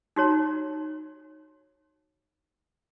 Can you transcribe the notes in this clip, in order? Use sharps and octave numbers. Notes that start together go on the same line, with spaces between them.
D#4 F#4 C#5 A#5